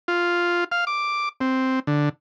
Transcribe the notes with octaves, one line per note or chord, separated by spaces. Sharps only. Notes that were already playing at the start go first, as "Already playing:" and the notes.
F4
F5
D6
C4
D3